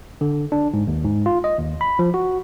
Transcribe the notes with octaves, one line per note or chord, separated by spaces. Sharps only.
D3
D4
G#2
D#2
G#2
F4
D#5
D#2
B5
F3
F#4